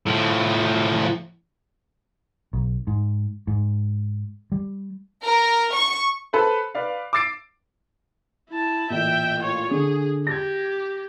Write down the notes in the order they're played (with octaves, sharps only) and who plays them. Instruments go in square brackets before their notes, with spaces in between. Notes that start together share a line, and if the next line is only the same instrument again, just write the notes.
[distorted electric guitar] A2 F3
[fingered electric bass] B1
G#2
G#2
G3
[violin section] A#4
C#6
[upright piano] A4 B4 C5
B4 D5 F5
D6 E6 A6 C7 D7
[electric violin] E4 A5
[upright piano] A1 A#2 [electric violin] E5 G5
[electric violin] F4 C#5
[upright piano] D3 [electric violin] G#4
[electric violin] G4 [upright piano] G#6 A#6